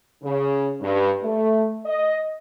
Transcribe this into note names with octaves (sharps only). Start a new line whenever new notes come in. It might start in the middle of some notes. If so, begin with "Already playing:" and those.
C#3
G2
A3
D#5